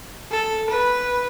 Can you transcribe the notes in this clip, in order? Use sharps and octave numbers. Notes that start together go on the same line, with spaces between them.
A4
B4